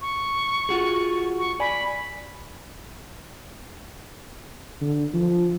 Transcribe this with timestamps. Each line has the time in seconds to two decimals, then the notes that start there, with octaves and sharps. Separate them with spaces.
0.01 C#6
0.69 F4 F#4 G#4
1.39 C#6
1.60 D5 G#5 B5
4.81 D3
5.14 F3